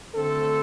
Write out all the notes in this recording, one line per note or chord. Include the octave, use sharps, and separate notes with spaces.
D2 D3 A3 C4 A4